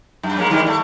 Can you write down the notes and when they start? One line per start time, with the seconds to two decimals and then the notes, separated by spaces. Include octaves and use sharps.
0.23 F#2
0.38 G#3 A#3 C#4
0.50 D#3 G3 G#3
0.67 A3